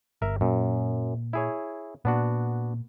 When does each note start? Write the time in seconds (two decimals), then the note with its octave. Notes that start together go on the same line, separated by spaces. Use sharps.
0.22 G1 A#4 E5
0.41 F#2 A#2
1.33 E4 G#4 C#5
2.05 A#2 B3 D4 F#4